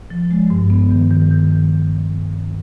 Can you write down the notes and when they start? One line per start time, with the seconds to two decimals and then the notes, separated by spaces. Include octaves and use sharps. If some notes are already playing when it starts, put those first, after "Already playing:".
0.10 F3
0.31 G#3
0.50 G2
0.70 B3
0.91 D#3
1.11 D#3
1.31 D#3